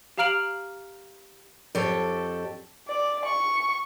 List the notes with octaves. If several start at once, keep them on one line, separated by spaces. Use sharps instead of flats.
G4 F5 A#5 F6 D7 F#7
F2 G4 A4 C#5 A5
D5
C#6